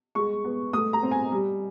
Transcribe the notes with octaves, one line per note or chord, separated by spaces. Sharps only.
G#3 C#6
B3
A3 D#6
A#5
C4
G#5
G3